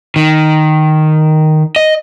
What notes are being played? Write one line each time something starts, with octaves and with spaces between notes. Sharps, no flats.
D#3
D#5